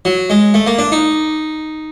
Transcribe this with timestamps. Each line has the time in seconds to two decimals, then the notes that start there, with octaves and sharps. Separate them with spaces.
0.05 F#3
0.30 G#3
0.54 A3
0.67 A#3
0.79 D4
0.92 D#4